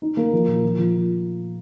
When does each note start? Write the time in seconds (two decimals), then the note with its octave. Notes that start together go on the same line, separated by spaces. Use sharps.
0.02 D#4
0.17 A#3
0.33 F3
0.47 A#2
0.63 F3
0.78 F3